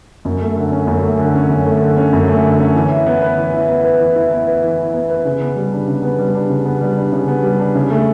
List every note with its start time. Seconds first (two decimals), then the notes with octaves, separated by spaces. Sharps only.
0.25 F#2
0.41 A3
0.56 D3
0.72 C#4
0.87 F#2
1.03 A3
1.19 D3
1.35 C#4
1.50 F#2
1.66 A3
1.81 D3
1.97 C#4
2.13 F#2
2.28 A3
2.44 D3
2.59 C#4
2.75 E3
2.91 E4
3.06 B3
3.22 B4
3.37 E3
3.53 E4
3.69 B3
3.84 B4
4.00 E3
4.16 E4
4.31 B3
4.47 B4
4.63 E3
4.78 E4
4.94 B3
5.10 B4
5.25 C#3
5.41 B3
5.56 G3
5.72 D4
5.88 C#3
6.03 B3
6.19 G3
6.34 D4
6.50 C#3
6.65 B3
6.81 G3
6.96 D4
7.12 C#3
7.28 B3
7.43 G3
7.59 D4
7.75 C#3
7.90 A3